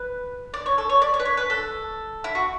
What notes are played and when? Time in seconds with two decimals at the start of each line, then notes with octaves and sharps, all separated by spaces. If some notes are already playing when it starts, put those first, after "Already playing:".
Already playing: B4
0.54 D5
0.66 C#5
0.78 A4
0.89 C#5
1.02 D5
1.14 C#5
1.20 B4
1.25 C#5
1.37 B4
1.50 A4
2.24 E4
2.35 F#4